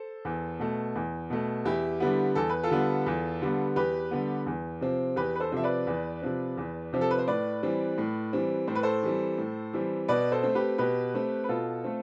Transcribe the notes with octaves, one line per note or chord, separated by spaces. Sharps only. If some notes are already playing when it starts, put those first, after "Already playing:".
Already playing: A4 C5
E2
B2 A3
E2
B2 A3
E2 E4 G4
D3 G3 B3
E2 A4
B4
F4 A4
D3 G3 B3
E2
D3 G3 B3
E2 G4 B4
D3 G3 B3
E2
C3 F3 C4
E2 G4 B4
B4
A4 C5
C3 F3 C4 E5
B4 D5
E2
C3 F3 C4
E2
C3 F3 C4 G4
A4
B4
C5
A2 B4 D5
E3 G3 C4
A2
E3 G3 C4
A2 C5
B4
A4 C5
E3 G3 C4
A2
E3 G3 C4
B2 B4 D5
A4 C5
A3 C4
G4 B4
B2 G4 B4
A3 C4
B4
B2 F4 A4
A3 C4